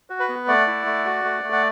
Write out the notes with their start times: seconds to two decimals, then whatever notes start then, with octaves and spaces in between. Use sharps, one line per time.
0.10 F#4
0.20 B4
0.29 B3
0.48 A3 D5 F#5
0.67 E4
0.86 A3
1.05 F#4
1.24 A3
1.44 A3
1.53 F#5